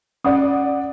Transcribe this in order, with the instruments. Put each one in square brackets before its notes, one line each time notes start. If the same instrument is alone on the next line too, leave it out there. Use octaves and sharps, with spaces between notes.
[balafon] C#4 [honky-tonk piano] D5 F#5 D#6